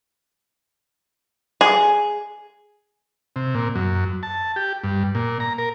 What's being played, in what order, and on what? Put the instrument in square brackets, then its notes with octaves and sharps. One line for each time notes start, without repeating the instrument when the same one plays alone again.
[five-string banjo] G#4
[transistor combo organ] C3
A#2
F#2
A5
G4
G2
A#2
A#5
A#4